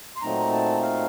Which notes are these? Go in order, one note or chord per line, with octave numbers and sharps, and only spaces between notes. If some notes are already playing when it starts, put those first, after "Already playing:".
C6
A#2 F#3 A3 C4 D#4 A#5
A5
F5